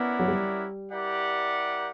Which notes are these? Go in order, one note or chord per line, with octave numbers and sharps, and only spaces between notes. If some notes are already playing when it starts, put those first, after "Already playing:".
Already playing: B3 C#4 E4 A#4 D5 F#5
F#3
G3
E4 G4 A#4 D5 F#5